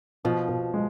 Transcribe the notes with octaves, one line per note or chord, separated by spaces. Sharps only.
B2 F3
B2
G#3